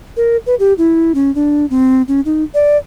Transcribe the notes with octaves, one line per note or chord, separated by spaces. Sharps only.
A#4
B4
G4
E4
C#4
D4
C4
C#4
D#4
D5